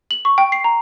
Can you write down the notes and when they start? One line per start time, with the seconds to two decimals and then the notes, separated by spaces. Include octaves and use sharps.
0.11 F#7
0.25 C#6
0.38 G5
0.52 C7
0.64 A#5